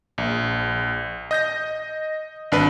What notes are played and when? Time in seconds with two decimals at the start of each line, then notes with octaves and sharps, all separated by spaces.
0.18 A#1
1.31 D#5 G6 A#6
2.52 G#1 D4 B4